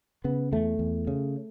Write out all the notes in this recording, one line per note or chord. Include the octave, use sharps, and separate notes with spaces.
C#3 B3
E2 A3
E2
C#3